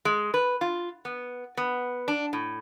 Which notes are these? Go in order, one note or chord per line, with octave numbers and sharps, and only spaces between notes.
G#3
B4
F4
B3
B3
D4
A2